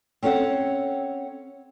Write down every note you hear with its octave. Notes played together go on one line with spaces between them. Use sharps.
C4 C#4 A4 C#5 F#5